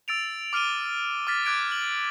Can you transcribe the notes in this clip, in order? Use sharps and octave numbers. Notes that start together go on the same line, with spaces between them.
E6 A6 D7 F7
D6 F6 D7 D#7 G7
D6 F6 A6 B6
D6 F#6 G#6 D7
F#7